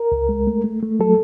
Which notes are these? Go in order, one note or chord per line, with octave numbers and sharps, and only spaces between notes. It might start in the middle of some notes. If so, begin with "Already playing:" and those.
Already playing: A#4
C#2
G#3
A3
A3
A3
F#3 A4